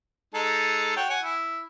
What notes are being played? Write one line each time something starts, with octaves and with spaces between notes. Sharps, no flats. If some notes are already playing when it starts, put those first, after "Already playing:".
G#3 D#4 A4
F#4 C#5 G5
F#5 G#5
E4